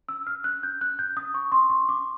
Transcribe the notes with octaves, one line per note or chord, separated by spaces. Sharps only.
E6
F6
F#6
G6
F#6
G6
D#6
C#6
C6
C#6
D6